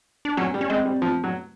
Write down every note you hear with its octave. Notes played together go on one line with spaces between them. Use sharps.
D4
F#3 C#4
G3
C#4
G#3 C4
G3
F3
F#3